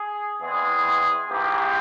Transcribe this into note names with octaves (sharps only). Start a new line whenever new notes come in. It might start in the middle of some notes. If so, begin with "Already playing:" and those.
Already playing: G#4
E2 E3 G#3 C4 G#4
G#1 G#2 E3 A#3 G4